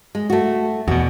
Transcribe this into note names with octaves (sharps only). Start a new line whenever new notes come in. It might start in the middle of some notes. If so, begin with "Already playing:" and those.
G#3
A3 F#4
E2 B2 F#4